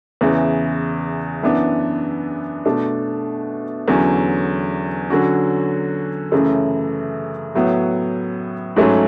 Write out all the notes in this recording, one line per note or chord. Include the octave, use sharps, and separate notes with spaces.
E2 C#3 E3
F#2 E3 B3 D4
B2 A3 D4
E2 D3 F#3 C#4
D3 F#3 C#4 F#4
F#2 C#3 E3 A3 E4
A2 F#3 B3
G#2 F#3 A3 C#4